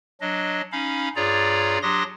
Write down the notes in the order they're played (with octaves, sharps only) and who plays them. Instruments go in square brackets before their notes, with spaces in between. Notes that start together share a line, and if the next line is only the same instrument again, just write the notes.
[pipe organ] F#3 D4 D#5
C#4 D#4 F5 B5
G2 F4 G#4 C#5 D5 A#5
F#3 D4 G4 C6 D#6 A#6